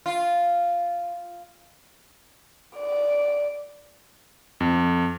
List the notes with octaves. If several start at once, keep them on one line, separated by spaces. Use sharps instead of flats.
F4
D5
F2